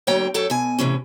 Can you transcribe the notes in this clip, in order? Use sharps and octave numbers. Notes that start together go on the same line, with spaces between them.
D2 D3 F#3 A#3 C#5 G5
F#2 F#3 A4 C#5 G5
B2 G#5
A2 C3 E3 C#4